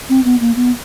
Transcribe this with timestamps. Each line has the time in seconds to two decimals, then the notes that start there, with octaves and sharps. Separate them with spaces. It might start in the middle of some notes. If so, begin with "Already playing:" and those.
0.09 C4
0.25 B3
0.41 A#3
0.56 B3